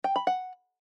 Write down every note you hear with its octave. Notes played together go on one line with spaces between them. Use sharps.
G5
B5
F#5